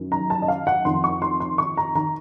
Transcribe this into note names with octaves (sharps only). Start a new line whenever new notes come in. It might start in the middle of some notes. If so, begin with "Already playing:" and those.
Already playing: F#2 D#3
A#5
A5
D#5
F5
F#5
F2 D#3 C6
C#6
C6
C6
C#6
A#5
D#3 A#5